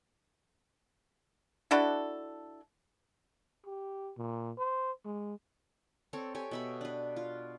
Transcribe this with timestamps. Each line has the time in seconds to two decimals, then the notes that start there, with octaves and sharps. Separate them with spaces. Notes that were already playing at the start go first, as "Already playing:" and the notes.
1.71 D4 E4 F#4 A4
3.66 G4
4.17 A#2
4.58 C5
5.05 G#3
6.13 C4 A4 C#5
6.35 G4 A4 C#5 G#5
6.51 B2 E5 B5
6.81 D4 B4
7.16 F4